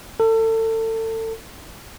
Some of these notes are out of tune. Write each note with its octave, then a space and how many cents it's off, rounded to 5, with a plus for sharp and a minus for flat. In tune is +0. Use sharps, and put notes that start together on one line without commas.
A4 +30